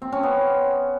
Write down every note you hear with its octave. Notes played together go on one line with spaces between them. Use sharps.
C4
C#4
B3